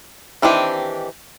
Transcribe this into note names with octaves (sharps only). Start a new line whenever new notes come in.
D#3 E3 C4 D4 G4